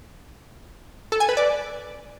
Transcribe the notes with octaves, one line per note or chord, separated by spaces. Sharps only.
A4
G#5
B4
D5